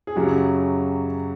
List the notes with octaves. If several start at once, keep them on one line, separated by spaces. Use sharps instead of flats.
G#4
F#2 C#3 F#3 G4